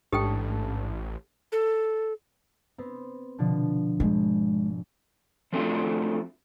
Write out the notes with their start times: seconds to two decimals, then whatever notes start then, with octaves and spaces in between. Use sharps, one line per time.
0.12 A1 G#2 D4 G4 A4 G5 A5
1.52 A4
2.78 B3 C4
3.38 B2 D3 F3
4.00 G#1 G#3
5.53 F3 A3 C4 D4 F4 F#4